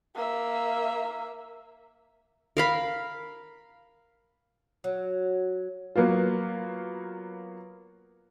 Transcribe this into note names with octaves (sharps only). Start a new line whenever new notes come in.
A#3 E5
A#4 F5 B5
F#3
F#3 A#3 B3 F4